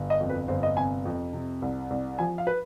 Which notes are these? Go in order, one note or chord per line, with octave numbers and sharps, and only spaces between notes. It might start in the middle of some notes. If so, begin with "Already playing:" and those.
Already playing: G1
D#5
F2
B4
G1 C5
D#5
C3 G#5
F2
C3
C2
C2
F3 G#5
F5
B4